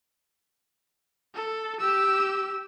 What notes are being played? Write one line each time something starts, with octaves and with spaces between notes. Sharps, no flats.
A4
G4 E6